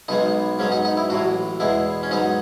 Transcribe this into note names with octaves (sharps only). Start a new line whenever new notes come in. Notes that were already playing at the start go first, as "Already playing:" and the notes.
B1 B2 G#3 B3 D#4
G#2 F#3 B3 C#4
D#4
D#4
E4
A1 A2 F#3 F#4
E2 B2 G#3 B3 E4
C#4
G#2 F#3 B3 D#4